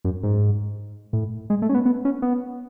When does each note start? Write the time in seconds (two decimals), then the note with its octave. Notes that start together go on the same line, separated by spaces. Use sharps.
0.05 F#2
0.23 G#2
1.13 A2
1.50 G#3
1.62 A3
1.69 C#4
1.74 B3
1.86 B3
2.05 C#4
2.22 B3